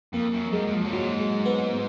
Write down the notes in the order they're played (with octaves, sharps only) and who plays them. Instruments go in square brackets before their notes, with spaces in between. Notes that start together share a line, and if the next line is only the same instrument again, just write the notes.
[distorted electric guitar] F2 [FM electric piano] A#3
[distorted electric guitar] F#2
[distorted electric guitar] F#2 [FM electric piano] G#3
[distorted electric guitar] F#2
F2
F#2
[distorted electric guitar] G#2 [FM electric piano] F#3
[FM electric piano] G#3
B3
B3